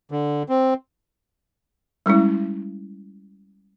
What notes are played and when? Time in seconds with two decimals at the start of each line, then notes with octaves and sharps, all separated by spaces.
0.11 D3
0.49 C4
2.06 G3 G#3 C#4 E4